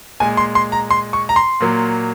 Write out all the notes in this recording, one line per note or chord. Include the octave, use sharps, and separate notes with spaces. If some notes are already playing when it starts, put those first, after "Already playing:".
A#2 G#3 G#5
C6
C6
A#5
C6
C#6
A#5
C6
A#2 F#3 A#3